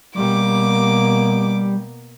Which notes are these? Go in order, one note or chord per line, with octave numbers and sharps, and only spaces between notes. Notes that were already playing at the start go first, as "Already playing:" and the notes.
B2 G3 A#3 D6